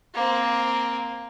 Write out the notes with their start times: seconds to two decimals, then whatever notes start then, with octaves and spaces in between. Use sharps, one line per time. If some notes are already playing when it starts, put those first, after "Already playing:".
0.14 A#3 C4